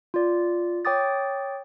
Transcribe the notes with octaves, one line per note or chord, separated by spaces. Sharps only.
F4 D5
C#5 G5 D6 D#6 A6